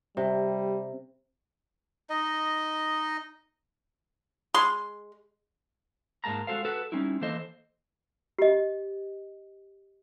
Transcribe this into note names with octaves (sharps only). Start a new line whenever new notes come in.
C3 G3
D#4 D#5
G#3 C6
G#2 G#3 A#3 A5 A#5
G#3 F#4 G#4 A4 C5 F5
F#4 A4 B4
G3 C4 C#4 D#4 E4
E3 A#3 A4 C5 D#5
G4 D#5